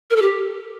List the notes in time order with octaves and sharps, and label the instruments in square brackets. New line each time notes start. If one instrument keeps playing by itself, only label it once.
[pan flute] A#4
A4
G4